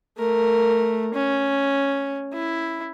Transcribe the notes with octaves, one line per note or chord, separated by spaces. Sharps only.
A3 A#4
C#4
E4